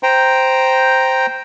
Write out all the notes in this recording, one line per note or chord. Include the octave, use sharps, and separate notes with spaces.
C5 G5 A#5